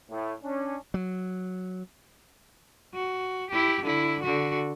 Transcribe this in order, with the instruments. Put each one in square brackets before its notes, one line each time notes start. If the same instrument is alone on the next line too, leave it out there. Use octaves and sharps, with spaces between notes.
[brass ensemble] A2
C#4 D4
[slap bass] F#3
[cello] F#4
E4 G4
D3 E4
D3 F#4